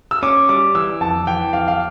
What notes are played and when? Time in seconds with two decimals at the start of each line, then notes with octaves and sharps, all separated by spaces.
0.11 E6
0.23 C#4 D6
0.49 G3 D6
0.75 E3 E6
1.01 F2 A5
1.27 E3 G5
1.53 F2 F5
1.68 F5